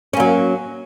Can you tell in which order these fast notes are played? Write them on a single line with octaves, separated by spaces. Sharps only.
C#4 A#3 F#3